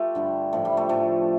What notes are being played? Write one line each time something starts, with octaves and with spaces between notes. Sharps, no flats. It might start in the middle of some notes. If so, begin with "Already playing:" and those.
Already playing: A3 F4 G4
G2 D3 G3
A2 F3 A3
G3
A3
A2 F3 A3